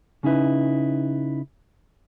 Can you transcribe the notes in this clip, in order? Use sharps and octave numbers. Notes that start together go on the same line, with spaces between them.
C#3 C#4 D#4 E4 B4